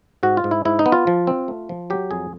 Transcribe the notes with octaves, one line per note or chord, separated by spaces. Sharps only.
G#2 F#4
F4
G#2
E4
G#2 E4
D#4
B3
F4
F3
C4
A3
F3
F#3 G4
F2 G#4